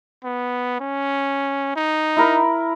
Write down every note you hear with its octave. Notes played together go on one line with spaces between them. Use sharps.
B3
C#4
D#4
E4 A#4 B5